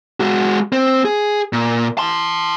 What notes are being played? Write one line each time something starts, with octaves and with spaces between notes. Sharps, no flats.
G#3 F#4
C4
G#4
A#2
A5 C6